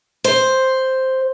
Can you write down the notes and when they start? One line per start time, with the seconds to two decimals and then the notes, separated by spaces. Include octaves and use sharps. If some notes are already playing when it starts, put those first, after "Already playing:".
0.24 C5